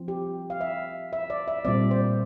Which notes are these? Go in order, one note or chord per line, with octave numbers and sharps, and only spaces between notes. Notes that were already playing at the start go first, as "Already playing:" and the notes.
Already playing: F3 C4 F4
G4
F5
E5
E5
D5
E5
A#2 G3 C4 D5
C5